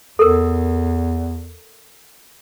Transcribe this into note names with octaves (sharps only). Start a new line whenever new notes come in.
E2 A4 A#4